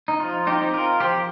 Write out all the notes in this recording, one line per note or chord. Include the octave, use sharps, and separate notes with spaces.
D#4
F3 F4
D#4 G4
C4
F4 A#4
F3 G4 C5